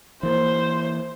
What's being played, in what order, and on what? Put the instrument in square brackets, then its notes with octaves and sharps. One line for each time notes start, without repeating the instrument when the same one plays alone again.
[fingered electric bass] E3 A#3 [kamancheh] C5